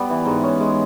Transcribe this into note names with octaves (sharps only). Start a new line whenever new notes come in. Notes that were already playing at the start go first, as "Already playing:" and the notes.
Already playing: G3 B3
E3
G#2
C#4
G#3